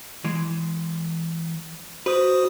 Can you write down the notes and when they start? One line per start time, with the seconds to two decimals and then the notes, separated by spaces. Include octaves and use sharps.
0.24 E3 G#3
2.06 F#4 B4 C5 D#6